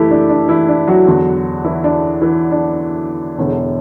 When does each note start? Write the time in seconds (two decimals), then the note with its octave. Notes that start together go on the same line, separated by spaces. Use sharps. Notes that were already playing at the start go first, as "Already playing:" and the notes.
Already playing: F#1 E3 A3 E4 G4 A4
0.11 D4
0.29 D4
0.48 E3 E4
0.68 D4
0.88 F#3 F#4
1.07 E2 D3 F#3
1.64 E3 E4
1.84 D4
2.21 E3 E4
2.51 D4
3.38 E1 E2 D3